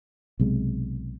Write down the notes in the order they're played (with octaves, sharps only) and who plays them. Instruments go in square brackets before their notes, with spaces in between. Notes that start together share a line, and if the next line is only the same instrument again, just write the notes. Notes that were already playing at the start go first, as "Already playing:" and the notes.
[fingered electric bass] B1 C3 G#3